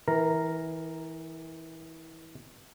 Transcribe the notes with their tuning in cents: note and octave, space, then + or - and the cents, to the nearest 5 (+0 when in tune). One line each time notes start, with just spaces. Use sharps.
E3 -25 A#4 +0 A#5 +0